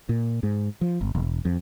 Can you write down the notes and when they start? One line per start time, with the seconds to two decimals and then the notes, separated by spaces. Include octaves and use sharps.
0.09 A#2
0.43 G#2
0.81 F3
1.01 G1
1.15 E1
1.45 F2